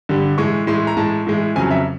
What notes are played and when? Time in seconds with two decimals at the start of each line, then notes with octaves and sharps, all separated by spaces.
0.09 G2 D3 G3
0.38 A2 E3 G#3 C#6
0.67 A2 E3 G#3 C6
0.87 A#5
0.97 A2 E3 G#3 A5
1.27 A2 E3 G#3
1.56 F2 C#3 F#3 G#5
1.71 E5